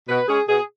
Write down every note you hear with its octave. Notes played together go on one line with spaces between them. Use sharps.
B2 B4
G#3 C#4 G#4
B2 G#4